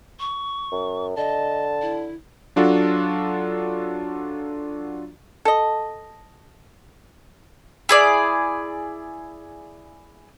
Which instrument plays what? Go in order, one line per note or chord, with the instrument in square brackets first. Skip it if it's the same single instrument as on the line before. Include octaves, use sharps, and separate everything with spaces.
[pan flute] C#6
[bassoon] F#2
[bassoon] D3 [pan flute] D#5 [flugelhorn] A5
[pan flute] E4
[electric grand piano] F#3 D4 F4 F#4 A4
[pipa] A4 D#5
[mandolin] E4 G#4 D5